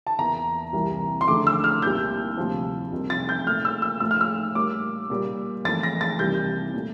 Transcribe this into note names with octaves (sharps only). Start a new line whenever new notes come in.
A5
E2 E3 A#3 A#5
C2 C3 E3 G3 A#3
C6
F2 D3 A3 D6
E6
F6
C2 A#2 G3 A#3 G6
D2 C3 F3
F2 C3 G3 A#3
A6
G6
A#2 A3 F6
E6
E6
A2 F3 A3 E6
F6
E6
A2 G3 A#3 D6
A#2 G3 A#3
F2 E3 A3 A6
A#6
A6
C2 C3 E3 G3 A#3 G6
A#2 A3